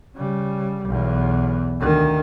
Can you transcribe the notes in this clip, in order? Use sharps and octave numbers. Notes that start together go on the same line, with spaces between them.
C#3 G3
B1 E2
D2 D#3